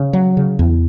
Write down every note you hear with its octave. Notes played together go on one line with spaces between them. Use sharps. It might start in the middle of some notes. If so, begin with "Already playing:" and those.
Already playing: C#3
F#3
C#3
E2